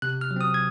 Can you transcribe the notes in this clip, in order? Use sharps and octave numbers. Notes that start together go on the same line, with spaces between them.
C3 F#6
F6
F#3
C4 D#6
G#6